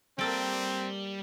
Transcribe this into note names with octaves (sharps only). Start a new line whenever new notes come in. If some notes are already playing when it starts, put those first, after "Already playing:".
G3 A#3 C4 A4 D5 G5